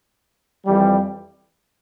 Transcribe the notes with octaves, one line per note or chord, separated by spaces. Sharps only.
F2 E3 G3